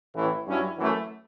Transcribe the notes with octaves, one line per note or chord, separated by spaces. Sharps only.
A1 A2 E3
G2 F#3 C#4 E4
F#2 E3 A3